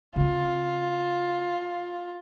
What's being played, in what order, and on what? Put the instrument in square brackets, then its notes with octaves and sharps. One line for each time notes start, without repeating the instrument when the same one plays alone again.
[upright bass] C#3 C4 [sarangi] F4